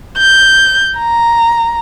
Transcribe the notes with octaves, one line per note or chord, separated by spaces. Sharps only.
G6
A#5